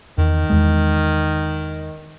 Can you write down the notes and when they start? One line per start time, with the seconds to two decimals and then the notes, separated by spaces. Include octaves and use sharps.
0.18 E2 D#3
0.50 E2 G#3